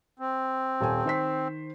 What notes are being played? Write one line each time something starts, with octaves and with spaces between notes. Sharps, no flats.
C4
D#1 A4 G#5
D#3 C5 B6